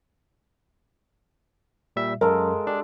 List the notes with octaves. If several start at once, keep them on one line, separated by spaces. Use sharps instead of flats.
A#2 G3 E5
F#2 G#3 A4 A#4 F5
D4 G4